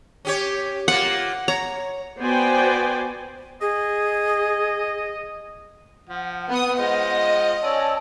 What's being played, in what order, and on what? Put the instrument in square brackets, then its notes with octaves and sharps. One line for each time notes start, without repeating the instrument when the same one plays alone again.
[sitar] C#4 G4 C#5
[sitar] A#3 F4 [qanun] F#5
[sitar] C#5 [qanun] A#5
[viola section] B3 F#4 C5 D5 G5 G#5
[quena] G#4 [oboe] D#5
[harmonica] F3 [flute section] F#5
[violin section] B3 D#6
[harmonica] G#3 F4 C5 [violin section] D#5
[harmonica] C#4 D5 [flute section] G#5 A5 E6